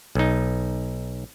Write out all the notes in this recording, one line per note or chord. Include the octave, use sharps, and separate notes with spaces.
B1 D#4